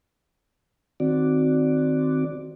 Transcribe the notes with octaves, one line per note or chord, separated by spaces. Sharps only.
D#3 C4 F#4 D5